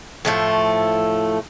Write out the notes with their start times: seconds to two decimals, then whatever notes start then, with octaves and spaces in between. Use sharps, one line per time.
0.25 A2 F3 A3